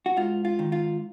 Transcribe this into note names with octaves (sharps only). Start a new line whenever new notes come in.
F#4
G#2 F4
F4
D#3
F4